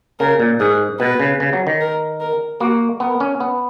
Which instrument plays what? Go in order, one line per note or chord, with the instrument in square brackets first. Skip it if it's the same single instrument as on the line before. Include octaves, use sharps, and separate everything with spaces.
[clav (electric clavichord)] C#3 [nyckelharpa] A#4
[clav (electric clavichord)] A#2
[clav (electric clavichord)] G#2 [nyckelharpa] G#4
[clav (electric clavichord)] B2 [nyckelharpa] B4
[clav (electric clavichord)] C#3
C#3
F#3
D#3
[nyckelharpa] A#4
A#4
[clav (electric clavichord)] A#3 [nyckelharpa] F#4
[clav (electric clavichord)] B3 [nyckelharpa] A#4
[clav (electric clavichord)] C#4
B3